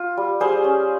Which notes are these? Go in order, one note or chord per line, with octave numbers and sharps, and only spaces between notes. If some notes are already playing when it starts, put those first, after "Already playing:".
Already playing: F4
G3
G3 G#4 C5
C#4